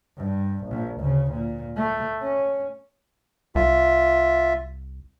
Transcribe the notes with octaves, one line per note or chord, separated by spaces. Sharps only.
G2
A#1
D2 C#3
A#2
A3
C#4
C2 F4 E5